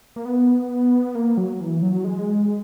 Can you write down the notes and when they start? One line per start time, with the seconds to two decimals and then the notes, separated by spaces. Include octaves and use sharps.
0.16 A#3
0.25 B3
1.15 A#3
1.37 F#3
1.60 E3
1.82 F#3
2.04 G#3